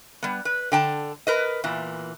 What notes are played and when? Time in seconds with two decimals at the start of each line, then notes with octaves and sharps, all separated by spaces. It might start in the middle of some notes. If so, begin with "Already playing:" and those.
0.23 G3 B3
0.45 B4
0.72 D3 G5 A5
1.27 A#4 B4 D#5
1.64 E2 A#2 E3